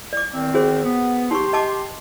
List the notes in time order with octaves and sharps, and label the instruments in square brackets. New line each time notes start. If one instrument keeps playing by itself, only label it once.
[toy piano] D5 D6
[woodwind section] E2 D#3 C4
[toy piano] F#4 G#4 C5
[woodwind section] B3
[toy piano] D#4 C#6 [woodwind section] G4 C6
[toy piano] D#5 A5 D6